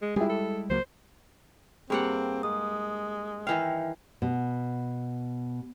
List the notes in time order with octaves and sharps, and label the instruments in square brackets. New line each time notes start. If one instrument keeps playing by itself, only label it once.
[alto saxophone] G#3
[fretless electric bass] G3 G#3 [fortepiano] E4 G4 [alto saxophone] G#4
[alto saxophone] A4
[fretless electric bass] C#2 F#3 A#3 [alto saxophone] C5
[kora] G2 A#3 F#5 [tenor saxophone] C4 [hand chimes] G4 G#4
[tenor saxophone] G#3 [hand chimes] D#6
[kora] D#3 E3 F5 [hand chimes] E5 G5
[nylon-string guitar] B2